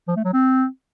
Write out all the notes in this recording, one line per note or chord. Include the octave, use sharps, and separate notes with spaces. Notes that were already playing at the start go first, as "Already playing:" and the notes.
F3
A3
F#3
C4